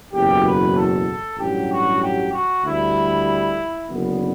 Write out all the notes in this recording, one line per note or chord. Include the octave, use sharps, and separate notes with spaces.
F#1 E2 B2 F#3 G4
B4
A4
A1 G2 F#3 G4
F#4
G4
F#4
D2 D3 G3 E4
F#1 F#2 D3 B3